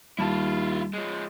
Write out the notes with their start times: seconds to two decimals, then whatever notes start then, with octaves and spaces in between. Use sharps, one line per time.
0.18 D#2 G3 E4 F4 A5
0.93 F3 G#3